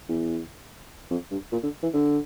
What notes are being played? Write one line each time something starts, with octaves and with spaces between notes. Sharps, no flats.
E2
F2
G2
A#2
D3
E3
D3